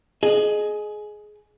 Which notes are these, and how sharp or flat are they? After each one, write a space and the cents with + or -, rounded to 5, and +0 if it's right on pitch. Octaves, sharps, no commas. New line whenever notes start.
G#4 +20 D#5 -15